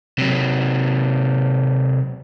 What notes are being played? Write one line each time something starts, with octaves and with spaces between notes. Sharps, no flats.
C3 F#3